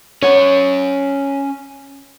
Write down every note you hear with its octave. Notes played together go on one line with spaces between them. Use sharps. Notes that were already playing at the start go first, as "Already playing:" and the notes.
C#4 C#5 F#5